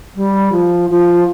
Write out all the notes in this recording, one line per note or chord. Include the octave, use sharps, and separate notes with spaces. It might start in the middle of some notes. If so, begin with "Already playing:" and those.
G3
F3
F3